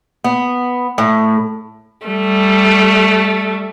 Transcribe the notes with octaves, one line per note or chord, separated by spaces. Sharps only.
B3
A2
G3 A3